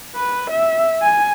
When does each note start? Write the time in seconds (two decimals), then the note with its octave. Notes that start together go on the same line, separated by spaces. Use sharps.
0.15 B4
0.51 E5
1.02 G#5